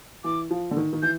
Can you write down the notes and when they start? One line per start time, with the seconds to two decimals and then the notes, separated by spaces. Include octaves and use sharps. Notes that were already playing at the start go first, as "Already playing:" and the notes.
0.24 E3 D6
0.51 F3
0.71 D3
0.77 D#3
0.93 D#3
1.02 E3 G6